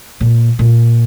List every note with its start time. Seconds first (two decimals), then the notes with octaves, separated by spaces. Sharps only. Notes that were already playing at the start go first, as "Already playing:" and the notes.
0.20 A#2
0.59 A#2